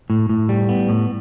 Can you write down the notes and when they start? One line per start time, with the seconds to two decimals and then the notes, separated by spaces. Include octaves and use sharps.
0.10 A2
0.29 A2
0.49 G3
0.69 B3
0.89 A2